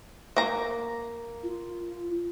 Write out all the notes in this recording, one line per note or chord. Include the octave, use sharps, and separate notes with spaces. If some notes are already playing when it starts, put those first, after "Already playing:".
A#3 A#5
F4